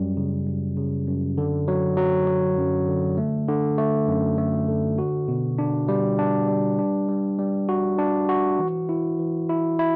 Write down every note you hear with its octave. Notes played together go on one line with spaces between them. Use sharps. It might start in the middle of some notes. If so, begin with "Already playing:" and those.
Already playing: F#2 G3
C#3
F#2
C#3
F#2
D3
F#3
F#3
F#3
F#2
D3
A3
D3
A3
F#2
A3
D3
F#4
B2
D4
G3
D4
G3
D4
G3
G3
F#4
D4
F#4
E3
E4
E3
E4
E4